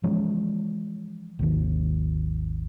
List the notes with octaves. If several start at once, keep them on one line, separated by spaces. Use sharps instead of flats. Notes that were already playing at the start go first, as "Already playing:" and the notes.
E3 F3 G#3 C#4
G#1 D#2 D#3